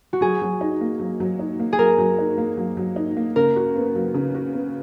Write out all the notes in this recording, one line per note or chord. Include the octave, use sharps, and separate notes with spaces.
F#4
F#3 G#4
F#3
D#4
A#3
F#3
F#3
D#4
A#3
G#4
F#3 A#4
F#3
D#4
A#3
F#3
F#3
D#4
A#3
C#3 A#4
F#4
B3
F#3
C#3
F#4
B3